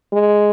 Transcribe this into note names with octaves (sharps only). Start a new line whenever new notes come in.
G#3